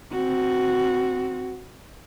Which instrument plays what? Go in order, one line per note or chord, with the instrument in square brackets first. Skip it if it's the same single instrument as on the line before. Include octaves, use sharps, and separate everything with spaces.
[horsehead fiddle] C4 F#4